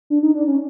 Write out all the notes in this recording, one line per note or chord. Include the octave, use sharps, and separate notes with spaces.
D4
D#4
D4
C#4